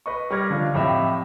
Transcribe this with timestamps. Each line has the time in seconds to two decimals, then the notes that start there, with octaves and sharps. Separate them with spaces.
0.06 B4 D#5 C#6
0.30 G3 G4 C#6 F6 G#6 A#6
0.50 D3 F3 D4 F4
0.74 F2 A2 G4 D#5 E5